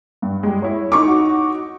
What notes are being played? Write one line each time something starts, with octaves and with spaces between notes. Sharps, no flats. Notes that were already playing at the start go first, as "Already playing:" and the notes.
G2
G3 G#3
E4 C#5
D#4 C#6 D6
F#4